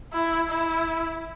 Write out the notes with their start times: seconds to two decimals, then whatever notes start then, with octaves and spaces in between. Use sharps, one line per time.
0.13 E4
0.50 E4